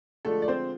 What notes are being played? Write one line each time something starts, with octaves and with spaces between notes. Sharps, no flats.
D3 F3 G#3 A3 D4 A4
D5
C4 C5